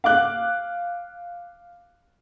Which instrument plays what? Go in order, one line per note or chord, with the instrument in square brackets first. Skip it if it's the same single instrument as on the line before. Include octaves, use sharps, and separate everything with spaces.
[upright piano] F5 D6 F#6